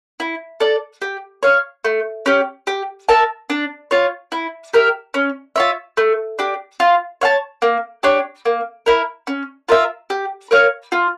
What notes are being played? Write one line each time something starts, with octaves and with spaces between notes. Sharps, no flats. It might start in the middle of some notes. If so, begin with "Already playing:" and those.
E4
A4 D5
G4
C#5 F5
A3
C#4 G4
G4
A#4 E5 A5
D4
F4 C#5
E4
G4 A#4 E5
C#4
F4 C#5 E5
A3
D4 G4
F4
C#5 F5 A5
A#3
D4 G4 C#5
A#3
E4 A#4
C#4
F4 A#4 E5
G4
A#4 C#5 F5
F4